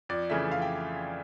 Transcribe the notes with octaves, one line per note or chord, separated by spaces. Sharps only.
F2 D5
C#3 E3 A3 E5
F2 F5
G5